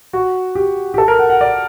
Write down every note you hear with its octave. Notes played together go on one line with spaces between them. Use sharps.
F#4
G4
G4
A4
A#4
F#5
F#5
D5